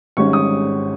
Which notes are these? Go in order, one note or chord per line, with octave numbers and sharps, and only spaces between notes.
G#1 G#2 G3 C#4 C#6
D#6